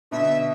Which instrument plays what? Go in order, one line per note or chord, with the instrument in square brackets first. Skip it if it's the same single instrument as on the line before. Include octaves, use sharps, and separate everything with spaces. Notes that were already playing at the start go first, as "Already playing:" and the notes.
[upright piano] B2 D3 [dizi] E5